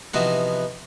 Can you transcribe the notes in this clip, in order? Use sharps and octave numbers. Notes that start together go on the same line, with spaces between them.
C3 E3 F3 B3 D#4 F#4